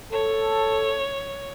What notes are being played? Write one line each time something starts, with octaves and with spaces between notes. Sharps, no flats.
A4 C#5